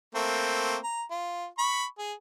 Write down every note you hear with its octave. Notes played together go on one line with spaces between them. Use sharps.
A3 A#3 C4
A#5
F4
B5 C#6
G#4